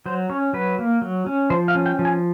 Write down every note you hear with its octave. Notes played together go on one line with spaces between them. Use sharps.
F#3 C5
C#4 C#5
F#3 B4
A#3
F#3
C#4
F3 C5
F5
C#4
G5
F3
G#5